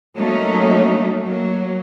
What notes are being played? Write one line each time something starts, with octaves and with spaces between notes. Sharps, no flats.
F#3 A3 A#3 C#4 D#4 F#4
F#3 A#3